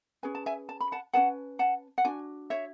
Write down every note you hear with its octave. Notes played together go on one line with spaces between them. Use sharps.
C#4 G#4 B4 G#5
A5
E5 G#5
A5
B5
F#5 A5
C#4 G#4 B4 F#5 A5
F#5 A5
F#5
D4 F#4 G#5
C#5 E5